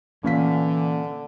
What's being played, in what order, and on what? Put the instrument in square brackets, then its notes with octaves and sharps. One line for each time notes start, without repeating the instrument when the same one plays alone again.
[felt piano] A#2 F5 B6 [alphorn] D3 [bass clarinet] E3 [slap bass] C#4